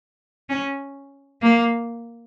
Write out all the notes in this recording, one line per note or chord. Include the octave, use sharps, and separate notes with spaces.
C#4
A#3